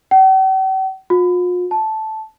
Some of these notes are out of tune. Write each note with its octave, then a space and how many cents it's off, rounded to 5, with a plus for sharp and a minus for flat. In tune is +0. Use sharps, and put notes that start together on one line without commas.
G5 -45
F4 +45
A5 -5